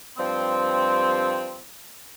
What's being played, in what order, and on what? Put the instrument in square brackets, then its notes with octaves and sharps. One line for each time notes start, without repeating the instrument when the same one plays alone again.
[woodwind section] G2 F3 G3 C4